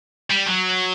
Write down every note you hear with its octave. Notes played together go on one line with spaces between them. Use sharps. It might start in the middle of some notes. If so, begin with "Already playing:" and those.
G3
F#3